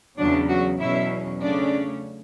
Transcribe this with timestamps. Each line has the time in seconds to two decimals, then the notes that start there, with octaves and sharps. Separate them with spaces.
0.19 E2 C#3 F#3 D4
0.49 F#3 F#4
0.80 E2 B2 F#3 C#4 E4 E5
1.41 C#3 F#3 A3 C#4 D4 D5